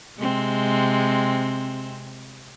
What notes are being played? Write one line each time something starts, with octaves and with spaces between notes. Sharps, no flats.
C3 G#3 C4